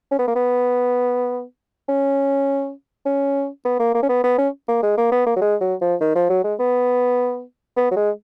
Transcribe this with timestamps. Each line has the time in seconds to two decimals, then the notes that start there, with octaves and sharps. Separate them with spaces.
0.12 C#4
0.19 B3
0.28 A#3
0.36 B3
1.89 C#4
3.06 C#4
3.65 B3
3.80 A#3
3.95 A#3
4.03 C#4
4.09 B3
4.24 B3
4.38 C#4
4.69 A#3
4.83 G#3
4.98 A#3
5.12 B3
5.27 A#3
5.36 F#3
5.42 G#3
5.61 F#3
5.81 F3
6.01 D#3
6.15 F3
6.30 F#3
6.44 G#3
6.60 B3
7.77 B3
7.91 F#3
7.96 G#3